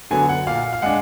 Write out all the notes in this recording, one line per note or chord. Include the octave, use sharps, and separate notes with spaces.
D3 F#3 B3 G#5
F#5
A#2 F5
F5
G#3 D4 F#5